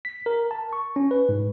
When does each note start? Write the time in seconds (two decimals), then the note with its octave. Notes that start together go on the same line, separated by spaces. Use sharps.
0.05 B6
0.26 A#4
0.51 A5
0.73 C#6
0.96 C#4
1.11 B4
1.29 G#2